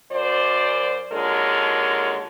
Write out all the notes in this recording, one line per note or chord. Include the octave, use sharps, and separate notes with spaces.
F#2 C5 D5
D#2 D3 G#3 F4 A#4 C#5